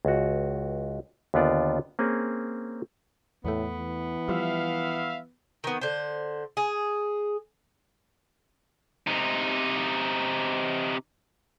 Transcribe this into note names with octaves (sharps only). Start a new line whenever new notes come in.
C#2 F#4
D#2 D3 B3 F4 D5
A#3 C4 C#4 G#4
E2 A2 A3 B3
E3
F3 G3 E5 F5
D#3 B3
D3 C5
G#4
C3 D#4